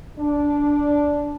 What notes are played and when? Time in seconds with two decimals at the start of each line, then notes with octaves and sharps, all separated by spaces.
0.18 D4